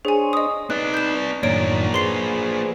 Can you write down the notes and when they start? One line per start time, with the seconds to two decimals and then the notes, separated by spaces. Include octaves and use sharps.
0.05 D4 G#4 C5 C#5 G#5
0.33 D#5 D#6
0.70 C4 D#4 B4 D5 F#6
0.94 G6 E7
1.43 F#2 A2 D#3 A#3 D4 C#5 D5 D7
1.94 G#4 B4 C5 C6 C7 G7